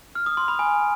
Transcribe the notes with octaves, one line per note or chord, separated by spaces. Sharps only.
F6
D#6
C6
B5
G#5